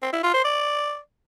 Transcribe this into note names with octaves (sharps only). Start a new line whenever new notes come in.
C4
E4
F4
C5
D5